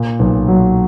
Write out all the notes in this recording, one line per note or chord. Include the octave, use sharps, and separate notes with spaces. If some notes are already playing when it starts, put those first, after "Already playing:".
Already playing: A#2
B1
F#3